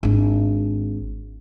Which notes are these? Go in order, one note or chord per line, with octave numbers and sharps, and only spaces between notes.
G#1 D4